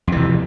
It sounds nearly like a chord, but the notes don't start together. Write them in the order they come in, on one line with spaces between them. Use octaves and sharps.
F2 E3 C3